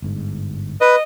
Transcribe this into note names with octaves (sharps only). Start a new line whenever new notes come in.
G1 G#2
B4 D#5